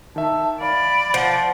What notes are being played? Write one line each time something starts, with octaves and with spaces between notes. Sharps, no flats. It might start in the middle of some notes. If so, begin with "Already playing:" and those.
D#3 E5 A5
D5 F5 B5
F3 F#5